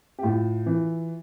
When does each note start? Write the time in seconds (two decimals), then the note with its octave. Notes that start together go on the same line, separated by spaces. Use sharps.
0.19 G4
0.23 A2 F4
0.66 E3